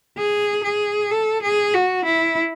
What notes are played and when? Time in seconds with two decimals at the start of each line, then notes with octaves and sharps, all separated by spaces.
0.18 G#4
0.64 G#4
1.11 A4
1.43 G#4
1.74 F#4
2.05 E4